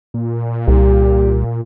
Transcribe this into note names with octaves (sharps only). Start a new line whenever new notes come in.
A#2
C2 G4